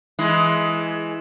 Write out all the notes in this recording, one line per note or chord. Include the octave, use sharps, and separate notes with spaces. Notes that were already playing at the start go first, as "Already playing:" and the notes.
E3 G#3 E4